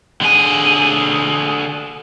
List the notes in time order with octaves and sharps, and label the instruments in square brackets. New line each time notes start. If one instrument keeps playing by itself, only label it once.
[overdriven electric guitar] D3 G#4